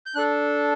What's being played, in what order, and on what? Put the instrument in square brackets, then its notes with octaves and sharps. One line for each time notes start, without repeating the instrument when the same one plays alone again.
[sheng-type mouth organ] G6
D4 A4 F#6